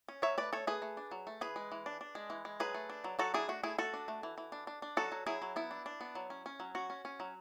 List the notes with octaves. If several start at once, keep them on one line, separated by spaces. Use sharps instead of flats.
C#4
F#3 C#5 E5
A3 B4 D5
A3 A4 C#5
A3 G#4 B4
A3
D4
F#3
A3
E3 G#4 B4
G#3
E3
D4
D4
G#3
E3
G#3
F#3 G#4 B4
A3
D4
F#3
F#3 F#4 A4
D4 E4 G#4
A3 F#4
A3 E4 G#4
A3 F#4 A4
D4
A3
E3
E3
D4
D4
D4
F#3 F#4 A4
F#3
F#3 E4 G#4
F#3
B3 E4
D4
D4
B3
F#3
C#4
C#4
F#3
C#4 F#4
C#4
C#4
F#3